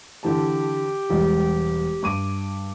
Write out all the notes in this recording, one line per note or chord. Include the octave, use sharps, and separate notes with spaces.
D3 E3 G4 A5
E1 G3 G#3
G2 D6 D#7